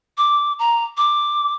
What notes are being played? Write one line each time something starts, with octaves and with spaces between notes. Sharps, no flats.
D6
A#5
D6